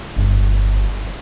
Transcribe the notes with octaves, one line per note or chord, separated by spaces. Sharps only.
G1